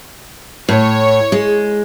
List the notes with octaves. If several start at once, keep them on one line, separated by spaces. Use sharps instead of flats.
A2 C#5
G#3